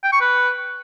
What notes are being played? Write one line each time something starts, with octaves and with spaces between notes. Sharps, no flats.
G5
C#6
B4